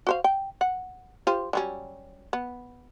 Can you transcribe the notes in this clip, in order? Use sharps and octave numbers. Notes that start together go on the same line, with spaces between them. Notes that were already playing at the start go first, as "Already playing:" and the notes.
F#4 C5 F5
G5
F#5
F4 G4 C5
F#3 G3 C#4
B3